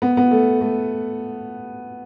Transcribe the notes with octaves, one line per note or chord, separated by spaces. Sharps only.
B3
B3
A3
A3